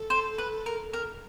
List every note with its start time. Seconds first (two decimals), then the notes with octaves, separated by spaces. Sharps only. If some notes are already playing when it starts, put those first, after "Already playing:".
Already playing: A4
0.10 C5
0.38 B4
0.66 A#4
0.93 A#4